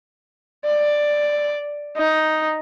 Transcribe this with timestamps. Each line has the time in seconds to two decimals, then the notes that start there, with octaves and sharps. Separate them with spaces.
0.66 D5
1.97 D#4